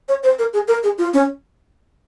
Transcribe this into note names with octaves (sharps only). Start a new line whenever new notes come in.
C#5
C5
A#4
G#4
A#4
G#4
F4
C#4